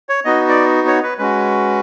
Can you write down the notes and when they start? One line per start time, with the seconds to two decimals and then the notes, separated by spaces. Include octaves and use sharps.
0.09 C#5
0.25 B3 D#4 F#4 D#5
0.49 D5
0.88 C#5
1.03 B4
1.18 G#3 C#4 F#4 B4